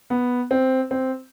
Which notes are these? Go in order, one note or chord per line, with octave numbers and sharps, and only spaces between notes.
B3
C4
C4